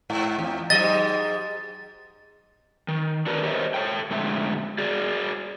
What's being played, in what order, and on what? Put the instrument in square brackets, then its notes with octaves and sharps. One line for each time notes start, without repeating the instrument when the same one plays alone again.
[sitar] G#2
E2
[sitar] G#2 F#3 D#5 [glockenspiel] A6
[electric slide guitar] D#3
D4 F#4 A#4 B4
G4 A#4 C5 C#5 D#5 E5
A4 C#5 G5
F2 A2 D3 G#3 E5
F#4 G#4 D5